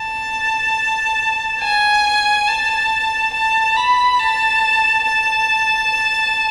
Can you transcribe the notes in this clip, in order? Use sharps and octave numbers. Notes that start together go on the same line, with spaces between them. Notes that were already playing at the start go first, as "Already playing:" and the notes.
Already playing: A5
G#5
A5
A5
B5
A5
A5